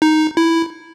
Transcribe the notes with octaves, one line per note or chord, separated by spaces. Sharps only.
D#4
E4